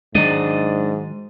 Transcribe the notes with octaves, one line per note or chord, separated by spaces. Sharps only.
G#2 D#3 F#3 G#3 D4 D5 D#5